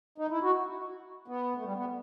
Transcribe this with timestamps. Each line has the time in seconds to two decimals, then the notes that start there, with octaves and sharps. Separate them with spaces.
0.18 D#4
0.31 E4
0.43 F#4
1.28 B3
1.58 A3
1.65 G3
1.76 B3